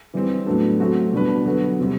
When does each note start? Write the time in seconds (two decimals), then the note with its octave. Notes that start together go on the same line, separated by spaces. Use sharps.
0.14 E3 G3 C4
0.46 A2 F#3 B3 D4 A4
0.80 F#3 A3 C4 F#4
1.13 B2 G3 D4 F#4 B4
1.46 D3 F#3 B3 F#4 B4
1.79 C3 G3 C4